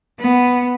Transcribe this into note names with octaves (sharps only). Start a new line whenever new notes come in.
B3